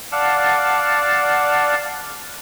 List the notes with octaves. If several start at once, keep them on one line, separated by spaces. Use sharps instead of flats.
D5 F5 F#5 A5